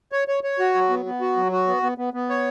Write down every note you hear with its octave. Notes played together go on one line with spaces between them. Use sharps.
C#5
C#5
C#5
F#4
F#3
B3
B3
F#4
F#3
F#4
B3
B3
B3
B3
C#5